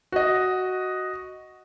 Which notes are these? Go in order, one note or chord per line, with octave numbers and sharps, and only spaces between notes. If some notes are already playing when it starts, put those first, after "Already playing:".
F#4 D#5